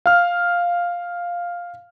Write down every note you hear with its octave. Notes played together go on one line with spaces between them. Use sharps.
F5 F6